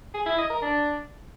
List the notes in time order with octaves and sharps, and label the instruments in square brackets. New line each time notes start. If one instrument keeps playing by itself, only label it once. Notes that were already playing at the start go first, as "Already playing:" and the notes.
[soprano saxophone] G#4
E4
D#5
A#4
D4